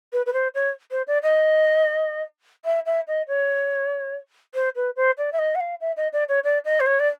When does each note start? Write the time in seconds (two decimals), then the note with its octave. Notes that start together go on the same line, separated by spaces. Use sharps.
0.13 B4
0.26 B4
0.33 C5
0.55 C#5
0.91 C5
1.07 D5
1.23 D#5
2.65 E5
2.86 E5
3.08 D#5
3.28 C#5
4.54 C5
4.76 B4
4.96 C5
5.18 D5
5.33 E5
5.39 D#5
5.55 F#5
5.60 F5
5.81 E5
5.97 D#5
6.13 D5
6.29 C#5
6.44 D5
6.65 D#5
6.80 C5
6.86 C#5
7.00 D5